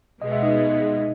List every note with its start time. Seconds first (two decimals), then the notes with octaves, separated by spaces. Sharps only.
0.21 B2 G#3 B3 D#5
0.32 E5
0.43 D#4 D#5